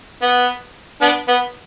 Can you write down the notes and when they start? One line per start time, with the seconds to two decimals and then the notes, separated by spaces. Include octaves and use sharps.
0.22 B3
1.01 B3 D4
1.28 B3